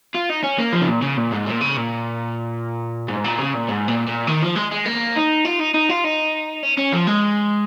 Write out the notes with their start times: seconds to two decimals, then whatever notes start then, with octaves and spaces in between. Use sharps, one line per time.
0.14 F4
0.29 D#4
0.43 C#4
0.58 A#3
0.73 F3
0.81 C#3
0.88 A#2
1.02 C#3
1.17 A#2
1.32 G#2
1.47 A#2
1.61 C#3
1.77 A#2
3.08 G#2
3.24 A#2
3.39 C#3
3.54 A#2
3.69 G#2
3.88 A#2
4.08 A#2
4.27 D#3
4.42 F3
4.56 G#3
4.71 G#3
4.86 A#3
5.16 D#4
5.45 F4
5.60 D#4
5.74 D#4
5.89 F4
6.04 D#4
6.63 C#4
6.78 C#4
6.93 F3
7.07 G#3